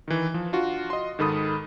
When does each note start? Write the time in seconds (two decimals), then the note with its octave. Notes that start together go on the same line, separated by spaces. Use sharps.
0.08 D#3 E3
0.34 F3
0.52 D4 F4 F#4
0.90 D#5 C6
1.19 G#2 D#3 A4 B5 D#6